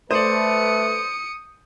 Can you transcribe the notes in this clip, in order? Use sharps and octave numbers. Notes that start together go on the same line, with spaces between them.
A3 B4 C5 D5 D#6 C#7